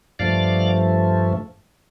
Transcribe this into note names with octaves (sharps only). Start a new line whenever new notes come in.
G2 F3 A3 D5 F5